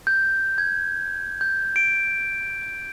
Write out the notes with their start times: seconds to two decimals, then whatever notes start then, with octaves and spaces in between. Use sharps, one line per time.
0.07 G6
0.58 G#6
1.41 G6
1.76 D7